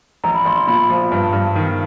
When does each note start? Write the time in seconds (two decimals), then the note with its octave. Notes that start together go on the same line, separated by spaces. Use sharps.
0.24 A#1 A#5
0.35 B5
0.45 A#1 C6
0.56 C6
0.67 A#2 B5
0.90 F3
1.12 G2
1.33 G2
1.55 D#3